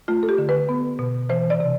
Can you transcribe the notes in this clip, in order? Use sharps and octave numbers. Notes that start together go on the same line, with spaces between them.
A3 F4
A4
G4
D3
B4
B3
B2
E3 C5
D5
C3